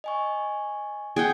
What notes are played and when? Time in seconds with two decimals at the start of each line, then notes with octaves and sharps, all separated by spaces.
0.04 D#5 G#5 C#6
1.16 G#4 F#5 G5 D7